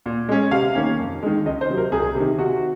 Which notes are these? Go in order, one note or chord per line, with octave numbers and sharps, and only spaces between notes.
A#2
G#3 C#4
C3 F5
D#3 A#3 C#4
F2
D#3 G#3
C#2 D#5
C5
C3 F#3
A#4
C2 G#4
C3
D#3
C3 F#4